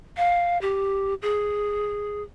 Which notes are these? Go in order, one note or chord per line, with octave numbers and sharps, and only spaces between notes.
F5
G4
G#4